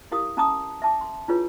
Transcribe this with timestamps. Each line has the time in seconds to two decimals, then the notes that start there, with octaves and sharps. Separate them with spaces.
0.11 E4 G4 A#4 F5 D#6
0.37 C#4 F5 A5 A#5 D6 D#6
0.82 E5 A5 D6
1.01 C6
1.28 D4 E4 F4 G#4 B4 C#5